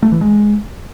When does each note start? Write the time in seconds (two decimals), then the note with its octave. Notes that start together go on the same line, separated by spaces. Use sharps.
0.02 A3
0.12 E3
0.21 G#3